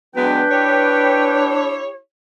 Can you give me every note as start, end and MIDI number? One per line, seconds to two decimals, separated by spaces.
0.16 0.43 54
0.16 0.43 56
0.16 0.43 59
0.16 1.80 62
0.16 1.56 71
0.16 1.56 79
0.51 1.96 64
0.51 1.96 67
0.51 1.96 73